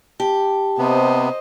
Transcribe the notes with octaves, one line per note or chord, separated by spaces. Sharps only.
G4 A5
C3 B3 C5 D#5